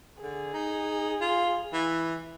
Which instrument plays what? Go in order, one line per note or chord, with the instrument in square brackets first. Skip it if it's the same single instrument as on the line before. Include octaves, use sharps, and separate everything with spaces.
[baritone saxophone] D3 [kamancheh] G#4
[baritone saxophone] D#4
F4
E3